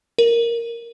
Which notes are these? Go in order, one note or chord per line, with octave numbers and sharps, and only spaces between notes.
A#4